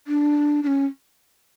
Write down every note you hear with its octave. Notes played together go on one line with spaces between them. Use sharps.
D4
D4
C#4